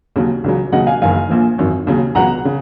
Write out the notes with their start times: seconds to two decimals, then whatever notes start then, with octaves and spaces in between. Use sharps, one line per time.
0.16 D#2 C#3 F#3
0.44 C#2 C#3 F#3
0.72 D#2 C#3 F#3 D#5 F#5
0.87 F5 G#5
1.02 F#1 F#2 D#3 F#3 F5 G#5
1.29 A#1 A#2 F3
1.58 G#1 F#2 D#3
1.87 D#2 C#3 F#3
2.15 C#2 B2 F#3 F#5 A#5
2.45 C#3